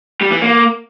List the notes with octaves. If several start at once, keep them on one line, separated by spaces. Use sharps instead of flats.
G3
E3
A#3